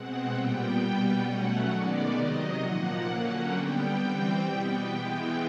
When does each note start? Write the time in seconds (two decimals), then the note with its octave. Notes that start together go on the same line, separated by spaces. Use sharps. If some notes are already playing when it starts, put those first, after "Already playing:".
Already playing: B2 G#3 C4 F#5
0.31 A#2 G3 B3 G5
0.77 B2 G3 B3
1.21 B2 F#3 A3 C#4 F#5
1.67 D#3 G#3 B3 D5
2.12 C3 D#3 F#3 D#5
2.58 A#2 F3 A#3 F#5
3.03 D3 F#3 A#3 C#4 F#5
3.48 D3 G3 B3 G5
3.94 E3 G3 C4 G5
4.39 B2 G3 B3 G5
4.85 E3 G#3 B3